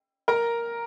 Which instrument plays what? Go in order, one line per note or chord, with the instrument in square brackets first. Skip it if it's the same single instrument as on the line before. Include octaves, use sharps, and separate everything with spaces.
[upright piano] A#4 A#5